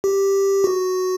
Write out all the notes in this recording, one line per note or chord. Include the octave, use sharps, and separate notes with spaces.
G4
F#4